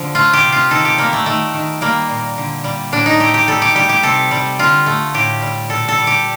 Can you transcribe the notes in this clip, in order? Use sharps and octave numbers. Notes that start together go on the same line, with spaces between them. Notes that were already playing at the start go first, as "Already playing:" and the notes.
Already playing: D3 F3
A3 F4
G4
C3
F4
D#3 A4
G4
G3 A#3
A3
D#3 A3
D#3
G3 A#3
A#2
D3
G3
A2 D4
D#4
A3 G4
G4
G3 A4
G4
G3 G4
G4
C3 A4
G3
D3 F4
A3
A2 G4
G3
A#2 A4
A4
G3
G4